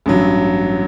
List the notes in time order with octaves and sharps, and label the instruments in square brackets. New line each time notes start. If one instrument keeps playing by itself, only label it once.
[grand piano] A1 G2 F#3